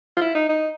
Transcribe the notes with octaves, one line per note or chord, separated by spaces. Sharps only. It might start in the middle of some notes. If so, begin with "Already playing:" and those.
F4
E4
D#4
D#4